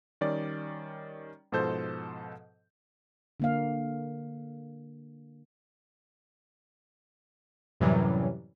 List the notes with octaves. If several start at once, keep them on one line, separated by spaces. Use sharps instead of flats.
D#3 G3 C#4 D5
G#2 B2 F3 A4 C5 G6
D3 A#3 F5
F#2 A2 C3 E3 F#3 G3